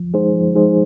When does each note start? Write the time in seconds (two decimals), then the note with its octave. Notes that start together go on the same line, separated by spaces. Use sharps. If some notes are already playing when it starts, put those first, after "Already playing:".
Already playing: F3
0.14 G#3 D#4 G#4 C5
0.34 F3
0.55 G#3 D#4 G#4 C5